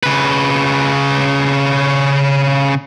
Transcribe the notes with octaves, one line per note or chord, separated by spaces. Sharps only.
C#3 B4